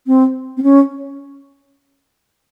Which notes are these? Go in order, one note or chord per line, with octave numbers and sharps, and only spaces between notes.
C4
C4
C#4